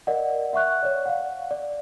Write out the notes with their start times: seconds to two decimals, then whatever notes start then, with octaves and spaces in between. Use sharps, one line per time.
0.07 A#4 D5 D#5 F#5
0.53 E5 F#5 C#6 F#6
0.83 C#5 D5
1.06 F5 F#5
1.51 D5